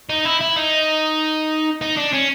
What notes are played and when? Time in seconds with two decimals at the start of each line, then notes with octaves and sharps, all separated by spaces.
0.10 D#4
0.25 E4
0.41 E4
0.56 D#4
1.81 D#4
1.97 D4
2.13 C#4